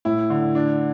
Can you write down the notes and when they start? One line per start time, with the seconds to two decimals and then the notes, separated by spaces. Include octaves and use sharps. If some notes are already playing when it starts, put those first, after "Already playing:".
0.05 A2 E4
0.30 D3
0.55 D4